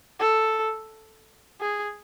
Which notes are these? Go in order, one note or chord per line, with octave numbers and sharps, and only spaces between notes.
A4
G#4